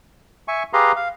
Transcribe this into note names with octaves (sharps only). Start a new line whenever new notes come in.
E5 G#5 C#6
G4 G#4 B4 F5 A#5 C6
F5